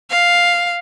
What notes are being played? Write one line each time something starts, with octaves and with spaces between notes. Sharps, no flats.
F5